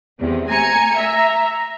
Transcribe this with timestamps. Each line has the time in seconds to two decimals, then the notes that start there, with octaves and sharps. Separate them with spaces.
0.20 E2 C3
0.49 A3 G#5 A#5 C#7
0.98 E5